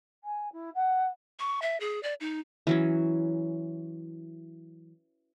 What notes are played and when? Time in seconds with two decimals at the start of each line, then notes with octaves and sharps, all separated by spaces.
0.23 G#5
0.52 E4
0.75 F#5
1.40 C#6
1.62 E5
1.80 G#4
2.03 D5
2.20 D#4
2.67 E3 F#3 C#4